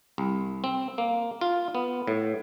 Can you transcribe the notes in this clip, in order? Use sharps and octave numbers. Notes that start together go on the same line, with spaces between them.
C2
C4
A#3
F4
B3
A2